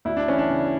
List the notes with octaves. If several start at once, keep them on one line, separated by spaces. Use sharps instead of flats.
D2 E4
D4
E3 C#4
D4
C#3